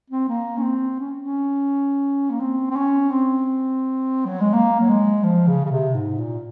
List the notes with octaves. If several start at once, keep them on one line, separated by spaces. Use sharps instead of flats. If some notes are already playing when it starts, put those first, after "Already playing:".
C4
A#3
C#4
C4
C#4
C#4
A#3
C4
C4
C#4
C4
F#3
G#3
A#3
F#3
G#3
F3
C#3
C#3
C3
G#2
A#2